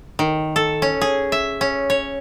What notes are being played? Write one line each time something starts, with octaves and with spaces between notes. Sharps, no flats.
D#3
A4
C#4
G#4
E5
C#4
C#5